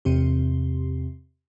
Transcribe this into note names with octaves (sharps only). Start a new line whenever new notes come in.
E2 C3 C4 G4